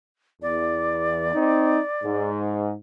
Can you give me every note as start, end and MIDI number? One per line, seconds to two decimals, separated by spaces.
0.42 1.29 40
0.42 2.30 74
1.34 1.78 60
1.34 1.78 63
2.03 2.73 44